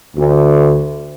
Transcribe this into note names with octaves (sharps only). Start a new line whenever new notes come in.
D2